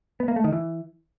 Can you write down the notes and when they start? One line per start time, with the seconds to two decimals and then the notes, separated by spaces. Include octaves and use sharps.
0.20 B3
0.28 A#3
0.36 A3
0.44 D#3
0.52 E3